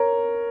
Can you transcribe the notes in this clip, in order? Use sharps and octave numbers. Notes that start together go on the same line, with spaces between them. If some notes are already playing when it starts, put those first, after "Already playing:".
Already playing: A#4 C#5